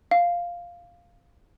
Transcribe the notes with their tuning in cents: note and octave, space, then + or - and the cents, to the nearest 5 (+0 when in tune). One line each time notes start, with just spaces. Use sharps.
F5 +0